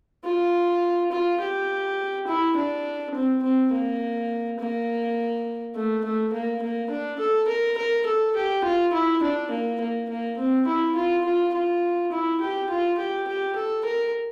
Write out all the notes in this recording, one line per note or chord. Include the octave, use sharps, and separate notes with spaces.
F4
F4
G4
E4
D4
C4
C4
A#3
A#3
A3
A3
A#3
A#3
D4
A4
A#4
A#4
A4
G4
F4
E4
D4
A#3
A#3
A#3
C4
E4
F4
F4
F4
E4
G4
F4
G4
G4
A4
A#4